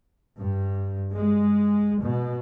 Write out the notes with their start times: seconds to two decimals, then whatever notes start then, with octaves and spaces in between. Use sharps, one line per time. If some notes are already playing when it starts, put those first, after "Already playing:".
0.38 G2
1.14 G#3
2.02 B2